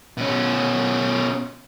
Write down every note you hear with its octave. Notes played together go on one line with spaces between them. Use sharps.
B2 C#4